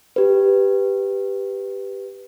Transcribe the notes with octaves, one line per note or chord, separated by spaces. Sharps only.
G4 B4